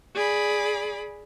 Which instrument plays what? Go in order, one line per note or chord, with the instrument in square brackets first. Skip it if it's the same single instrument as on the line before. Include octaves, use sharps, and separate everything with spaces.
[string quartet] G#4 D5 B5